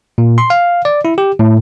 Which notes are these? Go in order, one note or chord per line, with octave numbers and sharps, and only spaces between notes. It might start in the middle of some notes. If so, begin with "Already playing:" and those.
A#2
C6
F5
D5
E4
G4
A2